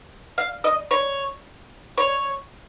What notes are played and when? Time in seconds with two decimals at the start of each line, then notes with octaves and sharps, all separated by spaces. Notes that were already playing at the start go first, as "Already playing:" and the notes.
0.38 F5
0.64 D#5
0.91 C#5
1.98 C#5